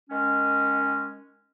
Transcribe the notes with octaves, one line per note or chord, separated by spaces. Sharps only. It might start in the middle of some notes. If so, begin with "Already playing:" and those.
D#3 G#3 C#4